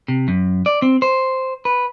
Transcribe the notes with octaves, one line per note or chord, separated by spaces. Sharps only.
C3
F#2
D5
C4
C5
B4